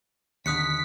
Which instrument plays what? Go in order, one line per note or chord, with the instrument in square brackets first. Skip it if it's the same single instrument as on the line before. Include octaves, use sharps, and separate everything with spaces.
[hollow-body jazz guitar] D#2 D3 [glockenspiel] D#6 F#6 C#7 [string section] B6